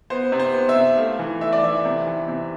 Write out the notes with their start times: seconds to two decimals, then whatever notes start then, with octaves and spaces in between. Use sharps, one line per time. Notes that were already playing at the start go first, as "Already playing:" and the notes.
0.10 B3 C5
0.32 C3
0.40 C5
0.54 B3
0.69 E5
0.75 C3
0.98 A3 F5
1.19 E3
1.41 A3 E5
1.53 D5
1.63 E3 E5
1.85 C3
2.07 E3
2.28 C3